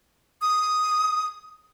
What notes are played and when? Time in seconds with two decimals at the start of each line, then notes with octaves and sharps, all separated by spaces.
0.42 D#6